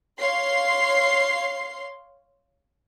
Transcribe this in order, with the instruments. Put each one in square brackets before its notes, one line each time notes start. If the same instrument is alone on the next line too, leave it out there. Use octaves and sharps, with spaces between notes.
[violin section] C#5 F5 C6 C7